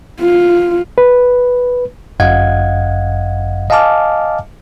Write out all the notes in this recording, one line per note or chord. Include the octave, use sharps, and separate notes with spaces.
F4
B4
G1 F#2 D#5 F5 F#5 G#6
D#5 F5 G#5 A5 D6 F6